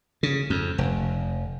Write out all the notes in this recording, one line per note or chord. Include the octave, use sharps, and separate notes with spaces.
C#3
F2
F1